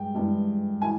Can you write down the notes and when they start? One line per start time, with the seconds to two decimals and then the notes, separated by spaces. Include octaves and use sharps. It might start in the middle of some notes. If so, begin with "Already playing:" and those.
Already playing: G2 G#3 G5
0.15 G2 E3 G#3
0.82 E3 G#5